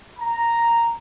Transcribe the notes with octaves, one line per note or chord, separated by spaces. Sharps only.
A#5